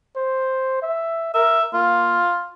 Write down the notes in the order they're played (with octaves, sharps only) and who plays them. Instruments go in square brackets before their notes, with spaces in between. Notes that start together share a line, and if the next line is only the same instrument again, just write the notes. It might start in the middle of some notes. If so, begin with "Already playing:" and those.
[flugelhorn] C5
E5
[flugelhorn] A#4 [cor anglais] E5
[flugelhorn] A#3 [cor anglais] F4